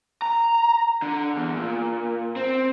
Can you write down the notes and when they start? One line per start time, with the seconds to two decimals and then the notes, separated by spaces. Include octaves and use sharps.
0.22 A#5
1.02 D3
1.36 E2
1.57 A#2
2.36 C4